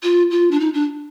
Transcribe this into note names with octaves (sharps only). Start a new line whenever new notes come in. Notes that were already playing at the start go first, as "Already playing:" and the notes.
F4
F4
D4
D#4
D4